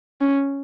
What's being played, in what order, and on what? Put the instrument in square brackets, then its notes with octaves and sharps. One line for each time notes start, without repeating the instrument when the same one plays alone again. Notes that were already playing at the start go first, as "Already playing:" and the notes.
[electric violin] C#4